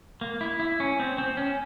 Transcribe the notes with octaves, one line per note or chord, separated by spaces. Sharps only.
A#3
E4
E4
C#4
C4
C4
C#4